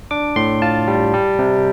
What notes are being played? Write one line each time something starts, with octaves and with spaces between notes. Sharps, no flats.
D4 D6
A2 C6
F4 A5
G3
G3
C3